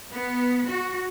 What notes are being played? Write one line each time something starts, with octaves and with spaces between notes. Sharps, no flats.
B3
F#4